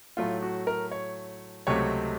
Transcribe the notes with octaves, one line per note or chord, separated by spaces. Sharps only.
A2 F#3 A3 F4
F#4
A#4
C#5
C#2 C3 F#3 A3 C4 C#5